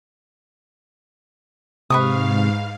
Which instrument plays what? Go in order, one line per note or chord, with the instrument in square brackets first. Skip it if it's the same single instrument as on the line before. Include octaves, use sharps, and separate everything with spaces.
[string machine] G#2 F5 [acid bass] C3 [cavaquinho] B4 C#6 D#6